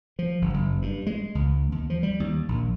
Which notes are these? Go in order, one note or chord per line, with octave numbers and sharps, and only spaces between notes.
F3
G1
F#1
G2
G#3
C#2
D#2
F3
G3
D#2
A#1